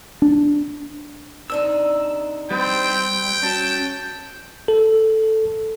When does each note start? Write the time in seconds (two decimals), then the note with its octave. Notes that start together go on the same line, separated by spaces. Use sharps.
0.22 D4
1.50 C3 D4 D#4 E6
2.51 G3 C4 G5
3.42 F#3 C#4 A5
4.68 A4